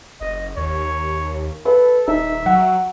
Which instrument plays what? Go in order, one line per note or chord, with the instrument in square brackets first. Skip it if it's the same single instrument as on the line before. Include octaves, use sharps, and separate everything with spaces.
[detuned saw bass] F#1 [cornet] D#5
[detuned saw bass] D#2 [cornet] C#5
[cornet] A4 [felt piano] B4
[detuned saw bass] D#1 [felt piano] D#4 [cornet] E5
[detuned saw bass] F#3 [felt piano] F#5